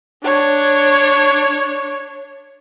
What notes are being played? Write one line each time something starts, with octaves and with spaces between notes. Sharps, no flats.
D4 C#5